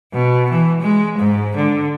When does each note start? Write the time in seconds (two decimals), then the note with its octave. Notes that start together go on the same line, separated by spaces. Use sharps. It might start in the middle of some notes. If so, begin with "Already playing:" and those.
0.14 B2
0.50 E3
0.82 G#3
1.18 G#2
1.57 D3